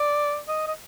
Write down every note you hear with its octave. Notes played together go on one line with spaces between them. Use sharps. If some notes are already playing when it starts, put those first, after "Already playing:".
Already playing: D5
D#5
D#5